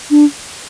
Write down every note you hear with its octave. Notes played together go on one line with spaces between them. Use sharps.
D4